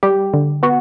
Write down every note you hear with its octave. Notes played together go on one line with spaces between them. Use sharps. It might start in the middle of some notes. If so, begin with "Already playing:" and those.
G3 G4
D3
B3 F#4